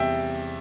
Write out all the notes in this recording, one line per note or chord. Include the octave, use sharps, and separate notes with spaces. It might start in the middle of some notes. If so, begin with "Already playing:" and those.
Already playing: E2 C3 G3 E5 G5